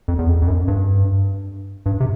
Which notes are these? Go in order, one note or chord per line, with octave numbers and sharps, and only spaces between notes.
F2
E2
F2
F2
F#2
G2
G2
C3